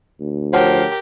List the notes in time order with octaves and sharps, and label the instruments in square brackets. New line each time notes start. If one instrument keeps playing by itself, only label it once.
[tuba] D2
[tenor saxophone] F3 [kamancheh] G4 A#4 [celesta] C#5 F#5 A5